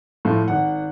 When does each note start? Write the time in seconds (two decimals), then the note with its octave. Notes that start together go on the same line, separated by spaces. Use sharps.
0.25 A2 F3 A3 F4
0.48 G#1 F#5